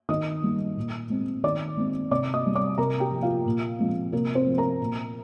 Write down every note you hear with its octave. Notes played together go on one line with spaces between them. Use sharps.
D#3 D#5 D#6
G3 A#3
A#2
G#3 C4
D#3 D5 D6
G#3 C4
C3 D5 D6
D#5 D#6
G3 C4
D5 D6
C3 A#4 A#5
G4 G5
F3 A#3
F4 F5
A#2
F3 G#3 C4
C3 A#3 A#4
C4 C5
F3 A#3
A#4 A#5
A#2